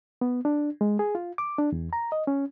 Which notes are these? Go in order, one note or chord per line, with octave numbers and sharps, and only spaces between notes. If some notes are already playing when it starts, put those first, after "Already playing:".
B3
D4
G#3
G#4
F4
D6
D4
E2
A#5
D#5
C#4